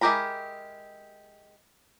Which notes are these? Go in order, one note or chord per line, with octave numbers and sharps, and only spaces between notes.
G#3 E4 G4 A#4 B5